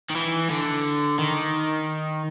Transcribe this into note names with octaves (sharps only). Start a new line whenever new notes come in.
D#3
E3
D3
D#3